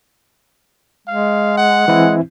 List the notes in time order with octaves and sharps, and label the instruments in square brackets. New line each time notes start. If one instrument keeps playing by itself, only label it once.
[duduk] G#3 [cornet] F5
[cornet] F#5
[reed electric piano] E3 C4 E4 [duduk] G#3